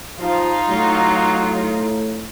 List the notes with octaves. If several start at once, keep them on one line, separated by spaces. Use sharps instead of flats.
F3 D#4 F4
A2 F#3